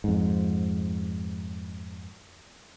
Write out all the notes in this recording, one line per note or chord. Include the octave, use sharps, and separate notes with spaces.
F2 G#2